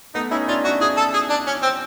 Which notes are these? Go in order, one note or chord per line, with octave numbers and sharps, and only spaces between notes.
A3 B3 D#4
C#4 D#4 E4
D4 E4 F4
D4 E4 F#4
E4 F#4 G#4
A4
G#4
D4
C#4
C4